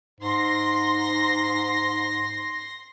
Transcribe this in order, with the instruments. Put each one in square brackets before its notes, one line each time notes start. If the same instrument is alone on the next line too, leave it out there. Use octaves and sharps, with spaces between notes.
[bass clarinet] G#2 [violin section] C6 A#6